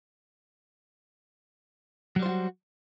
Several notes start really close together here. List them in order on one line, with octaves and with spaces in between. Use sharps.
F#3 G3 C5 F4 F#4